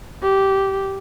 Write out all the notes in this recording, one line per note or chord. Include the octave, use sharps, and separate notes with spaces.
G4